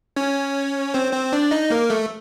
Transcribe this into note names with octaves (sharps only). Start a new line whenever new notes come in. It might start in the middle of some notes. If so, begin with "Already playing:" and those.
C#4 C#5
C4 C5
C4 C5
D4 D5
D#4 D#5
A#3 A#4
A3 A4